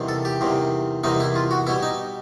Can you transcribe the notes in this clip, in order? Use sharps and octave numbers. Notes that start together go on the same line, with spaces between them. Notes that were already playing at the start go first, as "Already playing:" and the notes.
Already playing: E2 C3 D#3 G3
A4
G4
E2 C3 D#3 G3
E2 C3 D#3 G3 D#4
E4
F4
F#4
B2 G3 E4
D#4